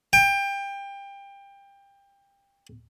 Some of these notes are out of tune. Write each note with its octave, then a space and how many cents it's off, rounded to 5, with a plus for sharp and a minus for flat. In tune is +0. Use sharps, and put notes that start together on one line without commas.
G5 +25